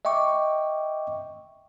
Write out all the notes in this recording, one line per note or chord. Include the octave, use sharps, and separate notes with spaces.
D#5 E5 G5 C#6 D6